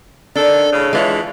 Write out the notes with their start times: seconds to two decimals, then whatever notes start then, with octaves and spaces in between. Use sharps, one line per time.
0.36 D#3 D4 A4
0.72 A2 C#3
0.93 D3 E3 G#3 F4 C#5